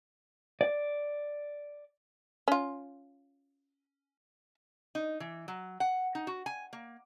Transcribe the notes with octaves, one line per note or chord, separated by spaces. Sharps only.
D5
C#4 F4
D#4
E3
F#3
F#5
D#4
F#4
G#5
A#3